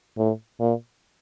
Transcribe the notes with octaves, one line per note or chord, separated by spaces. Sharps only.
A2
A#2